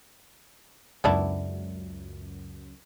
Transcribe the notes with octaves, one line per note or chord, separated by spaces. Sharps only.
C#2 F#2 B3 D4 E4